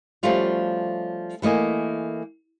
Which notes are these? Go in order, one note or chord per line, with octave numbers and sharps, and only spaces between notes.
F3 G3 A3 C#4 F4 F#4
E3 A3 A#3 D#5 G#5